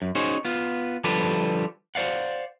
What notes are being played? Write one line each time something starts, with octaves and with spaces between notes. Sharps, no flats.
F#2
C#4 D#4 F#4 G#4 C5
B3 F4
D3 F3 G3 G4 A4 B4
C5 D5 F5 F#5